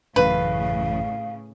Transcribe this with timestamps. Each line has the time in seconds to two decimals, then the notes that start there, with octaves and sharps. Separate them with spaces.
0.16 A1 F#2 A2 C#3 E3 B4 F5